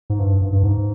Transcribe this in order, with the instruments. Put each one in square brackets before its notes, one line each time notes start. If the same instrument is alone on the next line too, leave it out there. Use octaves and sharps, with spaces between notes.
[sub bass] G#2
G2
G2
G2
G#2